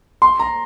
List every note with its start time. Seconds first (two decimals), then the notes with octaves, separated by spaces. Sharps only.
0.22 C6
0.39 A#5